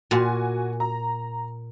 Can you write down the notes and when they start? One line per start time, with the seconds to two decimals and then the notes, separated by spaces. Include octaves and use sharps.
0.11 A#2 F#4 G#5
0.80 A#5